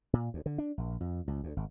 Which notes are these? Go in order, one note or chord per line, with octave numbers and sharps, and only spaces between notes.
A#2
D2
D3
D4
A#1
F2
C#2
D2
G#1